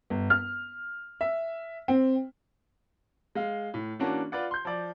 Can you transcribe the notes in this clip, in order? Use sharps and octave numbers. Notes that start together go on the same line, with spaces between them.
G1
F6
E5
C4
G#3 F5
A2
E3 A#3 C#4 D4 F#4
F4 B4 D5 F#5
C6 G6
F3 D5